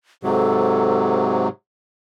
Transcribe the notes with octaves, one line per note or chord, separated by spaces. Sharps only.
G#2 C3 F#3 A4